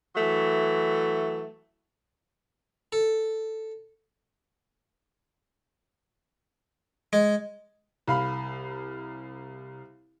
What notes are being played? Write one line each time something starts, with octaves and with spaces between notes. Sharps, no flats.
E3 F#3 A3
A4
G#3
C2 F5 B5